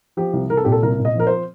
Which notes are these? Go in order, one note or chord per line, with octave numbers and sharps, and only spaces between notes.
F3 G4
C2
C2 A#4
A4
A#2 G4
A4
C2 A#4
A#2
D#5
F3 A#4
C5